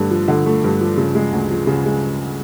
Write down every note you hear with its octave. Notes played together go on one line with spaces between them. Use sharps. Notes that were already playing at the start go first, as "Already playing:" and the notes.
Already playing: G2 D3 A3
F3
D3
A3
G2
F3
C#3
G#3
D2
F3
C#3
G#3